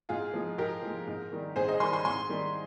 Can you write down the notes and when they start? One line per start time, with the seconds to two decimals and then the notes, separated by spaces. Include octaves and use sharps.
0.09 G#2 F4 G#4
0.34 F3 G#3
0.58 G#2 G4 A#4
0.83 F3 G#3
1.07 G#2
1.32 D#3 G3
1.56 G#2 G#4 C5
1.68 C5 D#5
1.80 D#3 G3 G#5 C6
1.93 G#5 C6
2.05 G#2 G#5 C6
2.29 D#3 G3